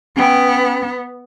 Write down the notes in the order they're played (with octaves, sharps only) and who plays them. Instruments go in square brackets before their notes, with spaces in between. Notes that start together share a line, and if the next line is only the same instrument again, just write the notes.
[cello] B3 [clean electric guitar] C#4 G5